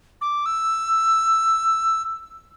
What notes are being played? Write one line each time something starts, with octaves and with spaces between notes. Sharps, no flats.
D6
E6